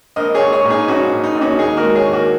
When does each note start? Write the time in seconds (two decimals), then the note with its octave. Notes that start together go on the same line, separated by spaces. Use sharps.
0.16 A#1 A#4 D#5
0.35 G#4 C#5
0.41 A#1
0.52 G#4 C#5
0.64 A#2
0.70 D#4 G#4
0.88 A#1 C#4 F#4
1.12 A#2
1.24 D#4
1.36 A#1
1.41 C#4 F#4
1.59 D#2 D#4 G#4
1.77 F#4 A#4
1.83 G#3
1.95 G#4 C#5
2.07 D#2
2.13 F#4 A#4